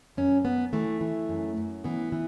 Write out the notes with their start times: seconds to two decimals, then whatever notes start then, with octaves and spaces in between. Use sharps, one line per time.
0.17 F#2 C#4
0.45 F#2 B3
0.73 E3 A3
1.01 E3
1.29 F#2
1.57 F#2
1.84 E3 B3
2.12 E3